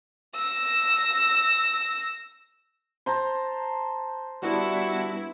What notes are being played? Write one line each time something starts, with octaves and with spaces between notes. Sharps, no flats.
E6 A#6
C5 A5 A#5
G3 B3 D4 E4 F#4